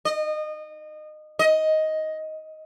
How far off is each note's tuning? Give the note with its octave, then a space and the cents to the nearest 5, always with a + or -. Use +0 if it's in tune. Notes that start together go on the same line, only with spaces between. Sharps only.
D#5 -25
D#5 +10